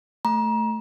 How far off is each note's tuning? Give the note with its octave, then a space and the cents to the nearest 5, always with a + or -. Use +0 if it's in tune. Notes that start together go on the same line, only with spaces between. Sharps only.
A3 +0 A#5 +30